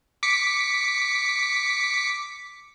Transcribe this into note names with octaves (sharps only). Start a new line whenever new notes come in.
D6 B6 C#7